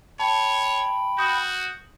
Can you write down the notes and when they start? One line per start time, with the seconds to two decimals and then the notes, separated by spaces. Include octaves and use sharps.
0.20 C#5 G5 A5 B5
1.18 F#4 D#6 G6